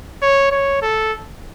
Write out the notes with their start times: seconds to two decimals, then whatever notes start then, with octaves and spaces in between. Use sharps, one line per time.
0.22 C#5
0.51 C#5
0.82 A4